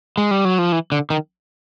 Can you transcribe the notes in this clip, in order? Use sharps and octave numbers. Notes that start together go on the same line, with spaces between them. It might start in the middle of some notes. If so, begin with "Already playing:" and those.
G#3
G3
F#3
F3
E3
D3
D#3